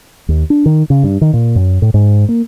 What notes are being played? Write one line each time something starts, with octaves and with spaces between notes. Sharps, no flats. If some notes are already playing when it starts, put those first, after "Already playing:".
D#2
D4
D#3
C#3
G2
D#3
A#2
F#2
A2
G#2
A#3